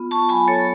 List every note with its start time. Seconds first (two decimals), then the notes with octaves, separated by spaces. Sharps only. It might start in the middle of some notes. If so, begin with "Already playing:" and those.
Already playing: B3 F4
0.11 A5 C#6
0.29 F#3 G#5 B5
0.48 A4 C#5